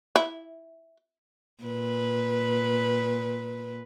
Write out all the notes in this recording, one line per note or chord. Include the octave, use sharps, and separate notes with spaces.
E4
A#2 B4